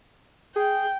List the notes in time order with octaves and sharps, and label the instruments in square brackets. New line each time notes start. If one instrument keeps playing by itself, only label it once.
[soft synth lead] G#4 [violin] G5